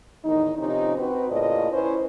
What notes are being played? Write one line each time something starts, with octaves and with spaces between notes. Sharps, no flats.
E2 A2 D#3 D#4
C3 F3 C#4 D#4
C4 F#4 B4
A2 C#3 A#3 F4 D5 D#5
C#4 E4 B4 C5